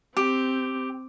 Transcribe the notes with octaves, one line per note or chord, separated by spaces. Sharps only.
C4 G4